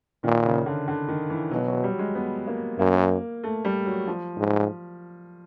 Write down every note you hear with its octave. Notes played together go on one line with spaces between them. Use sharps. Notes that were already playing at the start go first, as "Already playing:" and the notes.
A#2 D#3
C#3
D3
D3
D#3
E3
B2 F#3
F#3
G3
G#3
B3
A#3
F#2 A#3
A3
G3
F#3
F3
G#2